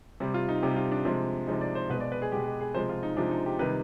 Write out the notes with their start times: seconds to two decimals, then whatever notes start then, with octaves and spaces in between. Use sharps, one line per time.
0.20 C3 G3
0.34 F4
0.49 D#4
0.62 C3 G3 G4
0.76 F4
0.92 D4
1.05 C3 F3 G#3
1.47 C3 F3 G#3 D#4
1.61 D5
1.75 C5
1.89 B2 B4
1.93 G#3
2.00 D5
2.12 B4
2.22 G#4
2.32 B2 G#3 G4
2.47 G4
2.61 G#4
2.74 C3 F3 G#3 C5
2.89 F4
3.03 D#4
3.17 C3 F3 G#3 D4
3.31 D#4
3.46 G4
3.59 C3 D#3 G3 B4